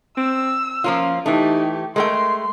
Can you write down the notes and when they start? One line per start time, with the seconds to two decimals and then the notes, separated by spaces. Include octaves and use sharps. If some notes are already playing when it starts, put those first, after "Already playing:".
0.17 C4 E6
0.84 F3 A#3 C#4 F4
1.26 E3 A3 D#4 G4
1.96 G#3 A3 A#4 G5 C6